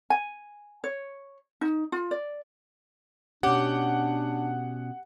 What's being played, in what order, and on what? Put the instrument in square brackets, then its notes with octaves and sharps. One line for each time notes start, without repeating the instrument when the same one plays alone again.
[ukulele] G#5
C#5
D#4
F4
D5
[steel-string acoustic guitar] B2 C#4 [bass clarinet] D4 [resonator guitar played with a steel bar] G4 [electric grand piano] F#5